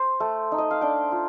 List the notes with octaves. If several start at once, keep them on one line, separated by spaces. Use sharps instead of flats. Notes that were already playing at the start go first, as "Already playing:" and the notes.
Already playing: C5
A3
D#4
D#5
F5
D4 G5
F4